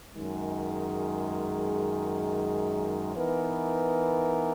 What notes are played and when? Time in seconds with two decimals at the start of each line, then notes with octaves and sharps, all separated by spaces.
0.14 F#2 D#3 G#3
3.16 E3 B3 D#4 A#4